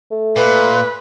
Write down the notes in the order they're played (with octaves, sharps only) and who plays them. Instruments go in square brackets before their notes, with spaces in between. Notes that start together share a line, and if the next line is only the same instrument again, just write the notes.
[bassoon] A3
[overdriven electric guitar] A#2 [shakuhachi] B4